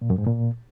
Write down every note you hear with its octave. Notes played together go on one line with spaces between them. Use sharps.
A#2
F#2
G#2
A#2